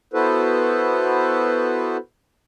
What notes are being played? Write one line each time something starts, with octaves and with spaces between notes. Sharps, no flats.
B3 E4 F#4 A4 B4 C5